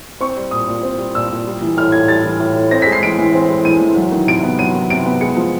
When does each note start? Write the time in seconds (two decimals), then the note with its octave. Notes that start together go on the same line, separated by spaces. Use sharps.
0.20 C4 C#6
0.37 G3
0.51 A#2 D#6
0.68 A#2
0.83 C4
0.98 G3
1.15 A#2 E6
1.30 A#2
1.46 G3
1.61 E3
1.77 A2 F6
1.92 A2 G#6
2.08 G3 A6
2.24 E3
2.40 A2
2.56 A2
2.71 C4 A#6
2.82 B6
2.87 G#3
2.92 C7
3.02 E3 D7
3.18 E3
3.34 C4
3.50 G#3
3.65 E3 D#7
3.81 E3
3.96 F#3
4.12 D#3
4.27 C3 D7
4.44 B3
4.59 F#3 D#7
4.75 D#3
4.90 C3 D7
5.06 B3
5.21 G#3 C#7
5.37 F3